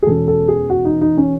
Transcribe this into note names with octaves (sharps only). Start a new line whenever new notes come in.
G#4
E2 B2 G#3 C#4 A4
A4
G#4
F#4
D#4
D#4
C#4